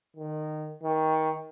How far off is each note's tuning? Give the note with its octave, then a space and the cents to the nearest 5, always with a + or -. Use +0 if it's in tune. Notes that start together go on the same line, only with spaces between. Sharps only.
D#3 -20
D#3 +20